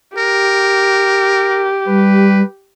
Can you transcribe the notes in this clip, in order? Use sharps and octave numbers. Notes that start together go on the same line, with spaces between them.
G4 A#4
G3 B4